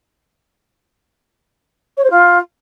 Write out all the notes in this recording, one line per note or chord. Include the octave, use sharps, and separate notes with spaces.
C#5
C5
F4